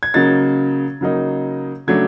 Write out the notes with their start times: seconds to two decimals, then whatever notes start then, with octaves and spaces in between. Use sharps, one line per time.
0.03 G#6
0.14 C#3 F#3 A#3 D#4 A6
1.01 C#3 F#3 A#3 D#4
1.87 C#3 F#3 A3 D4 G#6